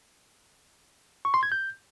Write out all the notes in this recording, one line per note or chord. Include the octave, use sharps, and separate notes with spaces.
C#6
C6
G#6
G6